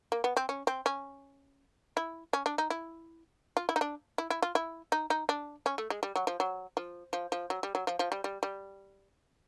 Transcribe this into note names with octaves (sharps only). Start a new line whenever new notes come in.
A#3
B3
C4
C#4
C4
C#4
E4
C#4
D4
D#4
E4
F4
E4
D#4
D4
E4
E4
F4
E4
D#4
D#4
D4
C#4
A3
G#3
G3
F#3
F3
F#3
F3
F3
F3
F#3
G3
F#3
F3
F3
G3
G3
G3